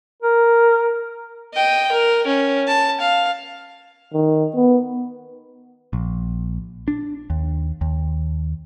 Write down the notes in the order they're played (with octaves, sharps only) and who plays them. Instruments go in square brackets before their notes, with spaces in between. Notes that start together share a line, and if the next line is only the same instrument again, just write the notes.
[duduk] A#4
[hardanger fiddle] D#5 G5
A#4
C#4
A5
F5
[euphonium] D#3
B3
[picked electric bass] A#1
D4
D#2
D#2